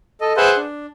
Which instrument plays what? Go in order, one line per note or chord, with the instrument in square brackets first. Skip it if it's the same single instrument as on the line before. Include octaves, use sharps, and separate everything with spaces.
[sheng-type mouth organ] A4 D#5
G#4 B4 C5 E5 F#5 C6
D4